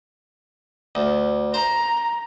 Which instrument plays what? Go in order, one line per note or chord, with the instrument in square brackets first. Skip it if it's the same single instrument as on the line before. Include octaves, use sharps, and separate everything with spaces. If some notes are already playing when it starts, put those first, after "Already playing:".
[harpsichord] D2
[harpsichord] C5 [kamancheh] A#5